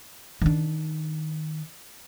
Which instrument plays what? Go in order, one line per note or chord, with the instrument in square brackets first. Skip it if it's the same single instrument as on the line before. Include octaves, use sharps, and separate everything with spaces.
[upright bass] D#3 D4